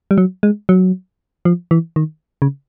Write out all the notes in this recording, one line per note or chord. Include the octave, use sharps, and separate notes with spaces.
G3
F#3
G#3
F#3
F3
E3
D#3
C#3